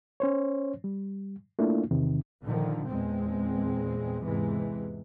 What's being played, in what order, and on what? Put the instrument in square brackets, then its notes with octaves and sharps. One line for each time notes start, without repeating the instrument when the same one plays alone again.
[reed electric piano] C#4 C5 C#5
G3
A3 A#3 D4 E4 F4
E2 C3 D#3
[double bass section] A#2 D3 D#3 F3
E2 A#2 G#3 C4
E2 G#2 C3 E3 G#3